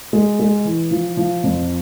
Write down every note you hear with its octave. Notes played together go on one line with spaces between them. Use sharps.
G#3
G#3
E3
F3
F3
F2